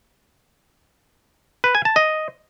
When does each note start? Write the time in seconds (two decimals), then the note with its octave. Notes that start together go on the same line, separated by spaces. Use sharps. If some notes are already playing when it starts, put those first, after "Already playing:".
1.64 B4
1.75 G#5
1.85 A5
1.96 D#5